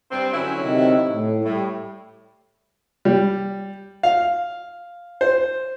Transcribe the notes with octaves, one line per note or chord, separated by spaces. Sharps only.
G2 C4
D3 F#3 C#4 E4
C3 D#3
A2
A2 G3
G3
F5
C5